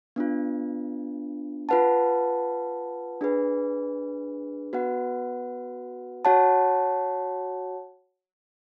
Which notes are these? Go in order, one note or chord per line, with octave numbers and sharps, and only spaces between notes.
B3 D4 F4
F4 B4 F#5 A5
D4 G#4 B4
B3 F#4 B4 F#5
F#4 C#5 F#5 A5